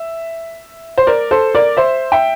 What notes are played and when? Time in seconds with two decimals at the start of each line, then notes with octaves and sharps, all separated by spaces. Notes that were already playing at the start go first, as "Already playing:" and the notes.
Already playing: E5
0.98 C5
1.07 A#4 D5
1.31 A4 C5
1.55 A#4 D5
1.77 C5 E5
2.12 E5 G5